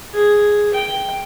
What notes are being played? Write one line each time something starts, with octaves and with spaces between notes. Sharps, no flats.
G#4
G5